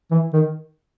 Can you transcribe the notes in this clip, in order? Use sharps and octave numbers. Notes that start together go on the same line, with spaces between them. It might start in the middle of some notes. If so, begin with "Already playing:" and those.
E3
D#3